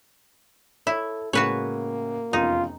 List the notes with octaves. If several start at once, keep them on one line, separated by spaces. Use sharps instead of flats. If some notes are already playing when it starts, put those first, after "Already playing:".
E4 A4 C#5
A2 C#3 G#3 A#3 F#4 B4 C#5
F1 E2 C#4 D#4 F4